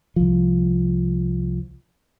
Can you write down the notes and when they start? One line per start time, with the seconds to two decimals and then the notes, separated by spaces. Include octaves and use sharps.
0.16 C2 F3